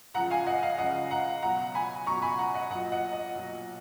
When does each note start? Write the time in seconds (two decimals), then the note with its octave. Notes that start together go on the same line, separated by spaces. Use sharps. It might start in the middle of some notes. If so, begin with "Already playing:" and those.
0.14 C#2 C#3 F3 F#5 A#5
0.31 F5 G#5
0.47 D#5 F#5
0.63 F5
0.78 C#2 C#3 F3 D#5 F#5
1.11 F#5 A#5
1.43 C#2 B2 F#3 F#5 A#5
1.75 G#5 B5
2.06 C#2 B2 F#3 A#5 C#6
2.22 G#5 B5
2.39 F#5 A#5
2.55 D#5 F#5
2.70 B1 A#2 F#3 D#5 F#5
2.92 D#5 F#5
3.13 D#5
3.35 B1 A#2 F#3